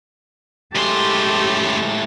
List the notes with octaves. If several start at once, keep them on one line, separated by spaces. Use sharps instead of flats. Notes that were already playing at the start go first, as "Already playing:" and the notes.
F#2 A2 G#3 G4 A4 C6